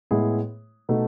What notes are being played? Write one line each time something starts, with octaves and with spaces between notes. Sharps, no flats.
A2 G#3 B3 E4 G#4
B2 A3 D#4 A4